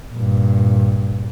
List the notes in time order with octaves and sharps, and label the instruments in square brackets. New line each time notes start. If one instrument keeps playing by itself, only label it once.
[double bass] G2 A#2